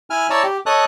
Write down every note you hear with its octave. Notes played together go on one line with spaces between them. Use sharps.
E4 G#5 F6
E4 C#5 D5 A5 A#5 E6
G4
A4 C#5 D#5 A5 D#6 F#6